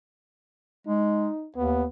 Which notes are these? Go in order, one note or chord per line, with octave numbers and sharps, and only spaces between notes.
G#3 D#4
D#2 B3